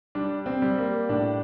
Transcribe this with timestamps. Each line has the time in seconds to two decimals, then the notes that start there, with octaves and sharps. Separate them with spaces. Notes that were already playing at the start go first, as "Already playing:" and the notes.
0.15 G3 D4
0.46 C4
0.62 G3
0.78 A#3
1.09 A2 D4